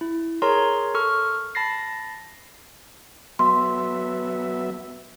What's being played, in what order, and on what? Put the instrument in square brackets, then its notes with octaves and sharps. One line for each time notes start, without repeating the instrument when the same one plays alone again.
[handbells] E4
G#4 A#4 C#5 A#5 C6
A4 C#6 F6
A5 B5 A6 A#6 C7
[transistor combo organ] F#3 B3 E5 [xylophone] C6